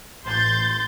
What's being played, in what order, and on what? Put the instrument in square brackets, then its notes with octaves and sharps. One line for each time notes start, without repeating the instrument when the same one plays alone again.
[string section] A1 C6 G6 A6